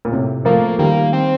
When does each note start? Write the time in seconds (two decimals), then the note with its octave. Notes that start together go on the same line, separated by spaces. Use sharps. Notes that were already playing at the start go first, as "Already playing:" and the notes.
0.05 A#2
0.12 A2 C3
0.45 F3 A3 A#3
0.79 D#3 G3 A#3
1.13 C4